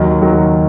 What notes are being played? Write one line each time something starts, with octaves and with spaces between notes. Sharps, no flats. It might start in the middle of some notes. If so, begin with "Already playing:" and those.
Already playing: D#2 D#3 F#3
D#3 F#3